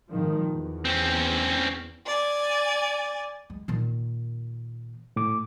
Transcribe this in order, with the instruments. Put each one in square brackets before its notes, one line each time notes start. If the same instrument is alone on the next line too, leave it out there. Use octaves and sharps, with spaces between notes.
[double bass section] G#1 D#3 F3
E2
[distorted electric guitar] C4 C#4
[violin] D5 G#5
[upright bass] G#3
A#2 D#3
[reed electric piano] A2 D6